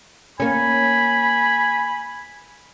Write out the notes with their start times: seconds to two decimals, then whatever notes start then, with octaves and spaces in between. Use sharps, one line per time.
0.40 A#3 C#4 G#5 B5